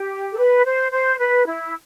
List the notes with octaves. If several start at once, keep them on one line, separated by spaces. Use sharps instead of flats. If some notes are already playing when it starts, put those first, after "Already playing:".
Already playing: G4
A4
B4
C5
C5
B4
E4